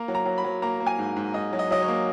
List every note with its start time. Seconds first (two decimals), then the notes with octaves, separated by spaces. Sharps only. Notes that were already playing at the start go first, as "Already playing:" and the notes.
Already playing: A#3 A#5
0.08 F#3
0.15 A#5
0.26 F#3
0.38 B5
0.44 F#3
0.62 A#3 A#5
0.80 A#3
0.87 G#5
0.99 G#2
1.16 G#2
1.34 G#2 D#5
1.53 F#3
1.59 D#5
1.71 F#3 D#5
1.82 C#5
1.88 A#3